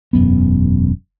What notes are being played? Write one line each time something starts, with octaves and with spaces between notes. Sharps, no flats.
E1 F#2 B3